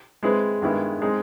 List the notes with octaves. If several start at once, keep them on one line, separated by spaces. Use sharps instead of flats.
G#3 C4 E4 G#4 B4
G2 D#3 G#3 B3 E4
G#3 C4 D#4 G#4